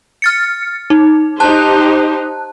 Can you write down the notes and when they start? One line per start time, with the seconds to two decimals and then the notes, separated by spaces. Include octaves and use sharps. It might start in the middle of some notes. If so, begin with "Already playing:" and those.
0.22 F6 A6 C#7
0.90 D#4
1.40 D#4 G4 C5 A5 F#6